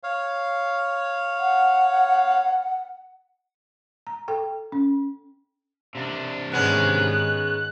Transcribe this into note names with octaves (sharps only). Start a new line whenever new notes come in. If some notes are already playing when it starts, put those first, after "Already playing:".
C#5 F5
F#5
A#5
A4 G5
C#4
C3 D4
G#2 D#3 G#3 B3 C#4 F#6